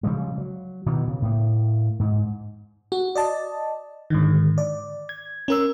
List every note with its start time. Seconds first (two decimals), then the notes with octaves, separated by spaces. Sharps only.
0.03 C#3 F3 G3 G#3
0.38 F#3
0.86 B2 D#3 E3
1.08 C#3
1.22 A2 A#3
2.00 G#2
2.92 F#4
3.15 D5 D#5 A5
4.10 G#2 D3 D#3
4.58 D5
5.09 G#6
5.48 C#4 A#4 E6